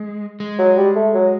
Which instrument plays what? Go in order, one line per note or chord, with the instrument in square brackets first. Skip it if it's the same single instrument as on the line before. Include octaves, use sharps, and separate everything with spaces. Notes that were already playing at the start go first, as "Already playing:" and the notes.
Already playing: [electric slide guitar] G#3
G#3
[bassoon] F#3
G3
A3
F#3